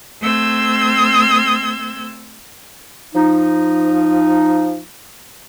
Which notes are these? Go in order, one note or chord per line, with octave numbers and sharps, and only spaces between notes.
A3 C4 E6 G6 G#6
F3 D#4